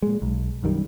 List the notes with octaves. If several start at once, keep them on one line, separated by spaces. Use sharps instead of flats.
A#2 G#3
B1
B1 F#2 D#3 G3